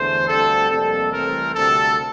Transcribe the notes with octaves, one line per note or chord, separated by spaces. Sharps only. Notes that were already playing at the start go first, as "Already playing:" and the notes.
Already playing: E2 D3 A3 C5
D2 D3 G3 C4 A4
F2 C3 G3 A#3 A4
C2 C3 E3 A3 C4 A#4
D2 C3 G3 C4 A4